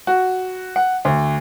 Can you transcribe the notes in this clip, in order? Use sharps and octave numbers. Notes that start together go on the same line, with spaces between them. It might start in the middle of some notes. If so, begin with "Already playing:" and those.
F#4
F#5
D2